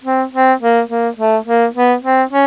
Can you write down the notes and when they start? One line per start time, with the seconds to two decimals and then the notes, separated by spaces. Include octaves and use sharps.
0.04 C4
0.34 C4
0.62 A#3
0.89 A#3
1.18 A3
1.46 A#3
1.75 B3
2.03 C4
2.31 C#4